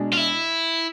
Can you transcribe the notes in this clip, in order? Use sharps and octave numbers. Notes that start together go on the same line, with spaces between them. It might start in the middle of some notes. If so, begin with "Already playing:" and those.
Already playing: B2 G#3 D4 G#4
F4
E4